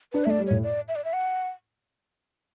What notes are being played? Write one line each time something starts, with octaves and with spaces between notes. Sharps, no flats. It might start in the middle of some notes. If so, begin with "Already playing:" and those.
D4 B4
A3 E5
D5
G3
A2 C#5
D5
E5
D5
E5
F#5